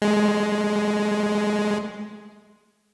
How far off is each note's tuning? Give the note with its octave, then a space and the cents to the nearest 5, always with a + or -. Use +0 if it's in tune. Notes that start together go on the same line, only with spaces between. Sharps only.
G#3 +10